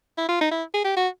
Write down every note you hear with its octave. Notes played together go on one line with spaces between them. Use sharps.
E4
F4
D#4
E4
G#4
G4
F#4